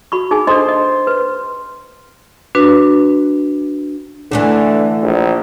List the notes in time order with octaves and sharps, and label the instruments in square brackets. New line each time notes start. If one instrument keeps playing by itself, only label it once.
[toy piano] F#4 B5 C#6
D#4 G#4 G#5
[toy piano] D4 A4 D#5 [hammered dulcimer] C5
[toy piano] D#5
B4
[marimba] D4 F#4 B4
[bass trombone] D3 [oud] E3 A3 D4
[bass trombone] A#1